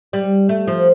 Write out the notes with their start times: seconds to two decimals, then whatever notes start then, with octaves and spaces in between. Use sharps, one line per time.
0.13 G3
0.49 A3
0.67 F3